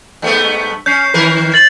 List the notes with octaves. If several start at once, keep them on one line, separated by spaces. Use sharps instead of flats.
G2 A3 B3
C#4 G6 C7
D#3 A#4 B4
A6 F#7